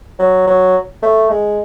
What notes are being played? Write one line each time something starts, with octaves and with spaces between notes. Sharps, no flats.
F#3
F#3
A3
G#3